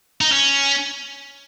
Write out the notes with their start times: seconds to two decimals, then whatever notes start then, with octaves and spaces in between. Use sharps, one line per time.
0.21 D#4
0.32 C#4